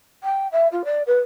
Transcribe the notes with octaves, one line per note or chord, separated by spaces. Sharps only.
G5
E5
F4
D5
B4